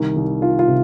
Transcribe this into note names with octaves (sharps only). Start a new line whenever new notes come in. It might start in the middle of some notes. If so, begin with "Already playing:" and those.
Already playing: C2 D#3
C2
D#3 F4
F4
C3